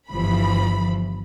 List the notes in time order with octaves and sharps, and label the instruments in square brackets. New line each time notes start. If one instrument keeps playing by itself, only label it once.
[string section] G1 E3 F3 B5